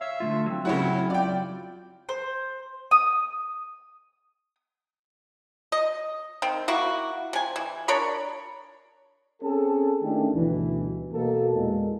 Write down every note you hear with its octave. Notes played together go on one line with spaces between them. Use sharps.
C#5 E5 F5
D3 A3 F4
F#3 C4
C#3 C#4 E4 F#4
F4 D5 G5
C5
D#6
D#5
D#3 C4
A#3 E4 F#4
C3 G#5
E3
D4 A#4 C#5 B5
C4 C#4 G#4 A4
D#3 A3 C#4 D4 E4 G4
D2 G2 B2 E3
B2 A#3 A4
E2 A#2 G#3